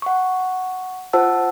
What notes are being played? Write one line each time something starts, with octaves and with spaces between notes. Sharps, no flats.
F#5 C#6
F4 C5 F#5 A5 E6